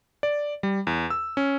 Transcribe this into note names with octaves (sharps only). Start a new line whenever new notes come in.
D5
G3
E2
E6
C#4